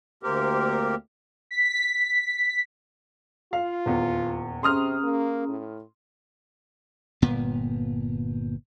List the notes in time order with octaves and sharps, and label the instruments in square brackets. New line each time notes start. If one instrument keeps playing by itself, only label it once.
[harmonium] D2 A#3 C4 G4 A#4
[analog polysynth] B6
[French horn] F4 [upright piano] F5
[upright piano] D#1 E2
[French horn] C3 [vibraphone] C#4 G#4 A#5 [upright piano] C6 D#6 F6
[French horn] A#3
A2
[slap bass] G1 A#2 B3